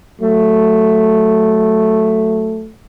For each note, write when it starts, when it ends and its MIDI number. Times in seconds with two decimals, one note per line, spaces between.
0.21 2.69 54
0.21 2.69 57